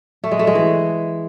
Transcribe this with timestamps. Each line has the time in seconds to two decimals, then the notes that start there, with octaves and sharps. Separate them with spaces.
0.24 A3
0.31 G#3
0.39 A3
0.47 G#3
0.55 E3